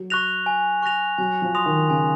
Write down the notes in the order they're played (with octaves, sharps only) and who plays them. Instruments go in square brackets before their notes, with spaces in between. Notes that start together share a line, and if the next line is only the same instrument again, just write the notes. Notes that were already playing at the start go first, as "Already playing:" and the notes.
Already playing: [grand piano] F#3
[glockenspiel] C#6 F#6 A#6 F7
G#5
C#6 F#6 A#6 F7
[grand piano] F#3 [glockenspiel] G#5
[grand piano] F3
[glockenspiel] C6 D#6 A#6 F7
[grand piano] D#3
[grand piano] C#3 [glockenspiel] G#5